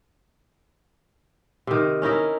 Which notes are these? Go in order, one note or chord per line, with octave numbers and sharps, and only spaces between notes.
C3 D#3
C#4 D#4 E4 A#4